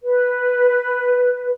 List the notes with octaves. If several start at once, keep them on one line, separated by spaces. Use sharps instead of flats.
B4